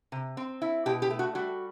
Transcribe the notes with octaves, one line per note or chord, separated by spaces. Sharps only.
C3
C4
E4
B2 G4
G4
A3
F#4
G3 F#4